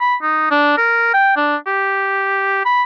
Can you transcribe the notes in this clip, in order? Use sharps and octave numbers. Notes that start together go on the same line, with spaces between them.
B5
D#4
D4
A#4
G5
D4
G4
B5